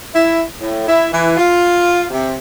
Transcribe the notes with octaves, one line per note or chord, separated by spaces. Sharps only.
E4
A2
E4
E3
F4
C3